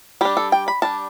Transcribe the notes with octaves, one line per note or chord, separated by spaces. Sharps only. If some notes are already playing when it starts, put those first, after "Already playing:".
G3 D4 G4
A4
G5
B5
G3 D4 A5